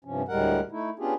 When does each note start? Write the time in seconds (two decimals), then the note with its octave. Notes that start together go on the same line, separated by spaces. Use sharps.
0.05 G2 C3 F3 C#4
0.28 D2 A2 G3 G#3 A#4 F#5
0.71 A3 D#4 E4
0.99 B3 C#4 D4 F4 G4 G#4